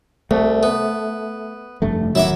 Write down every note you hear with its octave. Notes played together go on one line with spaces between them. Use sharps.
C2 A3
B3
F1 G2 A3
D1 D#3 F#3 E4 E5 D6